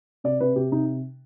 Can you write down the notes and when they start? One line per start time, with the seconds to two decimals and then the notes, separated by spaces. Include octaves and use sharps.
0.24 C3 D5
0.40 C3 B4
0.56 C3 G4
0.72 C3 D#4